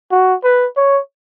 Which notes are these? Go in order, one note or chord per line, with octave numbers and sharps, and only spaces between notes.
F#4
B4
C#5